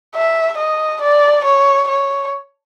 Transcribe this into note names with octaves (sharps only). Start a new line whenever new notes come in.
E5
D#5
D5
C#5
C#5